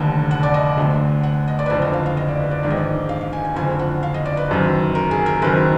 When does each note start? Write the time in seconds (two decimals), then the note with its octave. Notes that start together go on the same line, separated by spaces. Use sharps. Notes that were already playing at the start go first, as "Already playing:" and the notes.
Already playing: F1 D#2 D3
0.31 F#5
0.43 D5
0.54 D#5
0.78 D2 D3
1.23 F#5
1.48 D#5
1.59 D5
1.66 B4
1.70 F#1 F2 D3 D5
1.82 D#5
1.93 F5
2.06 F5
2.17 D#5
2.28 D5
2.40 B4
2.51 D5
2.63 A#1 G#2 D#3 D5
2.70 D#5
2.77 D5
3.09 F5
3.16 D#5
3.21 F5
3.33 G#5
3.45 G#5
3.56 F#1 F2 D3 G#5
3.79 F#5
4.03 F5
4.14 D#5
4.26 D5
4.37 B4
4.48 F#1 F#2 D#3
4.95 A#4
5.11 G#4
5.26 A#4
5.42 F#1 F#2 D#3 B4